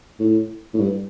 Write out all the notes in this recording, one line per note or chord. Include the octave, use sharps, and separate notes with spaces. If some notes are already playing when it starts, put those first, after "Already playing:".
A2
A2
G2